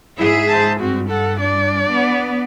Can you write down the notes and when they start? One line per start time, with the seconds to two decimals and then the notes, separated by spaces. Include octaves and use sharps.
0.18 G#2 E4 G#4 E5
0.49 C5 A5
0.79 G2 C4 F#4
1.09 A4 F#5
1.40 D4 D5
1.90 B3